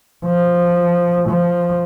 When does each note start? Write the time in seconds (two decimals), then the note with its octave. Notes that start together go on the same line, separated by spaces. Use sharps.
0.25 F3
1.28 F3